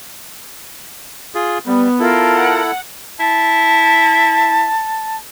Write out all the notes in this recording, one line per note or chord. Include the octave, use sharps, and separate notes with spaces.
F4 G#4
G3 B3
E4 F4 A4 A#4 A5
F#5
E4 A5